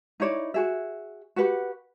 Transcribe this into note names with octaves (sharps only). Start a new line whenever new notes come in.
D#4 E4 C#5 D5
F#4 G#4 E5
F#4 G4 B4 F#5